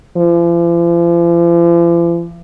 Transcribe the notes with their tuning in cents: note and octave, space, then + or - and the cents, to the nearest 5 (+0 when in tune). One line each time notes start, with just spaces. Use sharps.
F3 -45